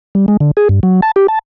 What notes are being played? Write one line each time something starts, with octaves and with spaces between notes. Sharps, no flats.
G3
G#3
D3
G#4
G2
F#3
A5
G4
A5